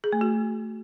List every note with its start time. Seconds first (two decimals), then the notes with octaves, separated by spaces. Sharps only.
0.04 G#4
0.12 A3
0.21 F#4